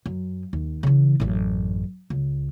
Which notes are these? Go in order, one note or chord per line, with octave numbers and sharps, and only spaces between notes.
F#2
D#2
C#3 E3
A1 F#2
C#2